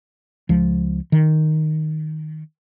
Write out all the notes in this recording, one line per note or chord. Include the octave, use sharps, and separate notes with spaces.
C#2 F3
D#3